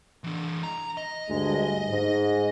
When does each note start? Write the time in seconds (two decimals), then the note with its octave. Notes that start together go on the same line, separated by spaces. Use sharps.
0.24 E3 D4
0.63 A#5
0.97 D#5
1.29 D2 G2 G#3
1.89 G#2